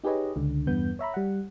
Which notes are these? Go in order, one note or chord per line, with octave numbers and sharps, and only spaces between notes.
D#4 G4 G#4 B4 C#5 D#5
C#2 D3
E2 G2 B3 G6
C#5 E5 A#5 B5
G3 F#5